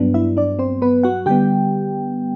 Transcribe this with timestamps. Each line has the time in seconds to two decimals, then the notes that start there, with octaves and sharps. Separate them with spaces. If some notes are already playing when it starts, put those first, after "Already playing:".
Already playing: G2 F#3 B3 D4
0.14 E4 E5
0.37 D4 D5
0.59 C4 C5
0.82 B3 B4
1.03 F#4 F#5
1.26 D3 G3 B3 G4 G5